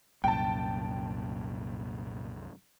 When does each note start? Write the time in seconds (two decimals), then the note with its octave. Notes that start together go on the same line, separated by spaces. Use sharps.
0.24 C2 F#2 A#2 G5 A5